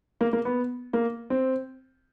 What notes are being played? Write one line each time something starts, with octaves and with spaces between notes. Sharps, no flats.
A#3
A#3
B3
A#3
C4